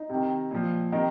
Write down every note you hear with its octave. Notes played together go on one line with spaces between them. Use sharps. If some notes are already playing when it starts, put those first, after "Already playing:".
Already playing: D#4
C3
D#3
A#2 F3
C3 D#3 D#4